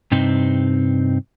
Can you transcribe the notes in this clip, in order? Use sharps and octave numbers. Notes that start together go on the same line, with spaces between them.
G2 C3 C4 D#4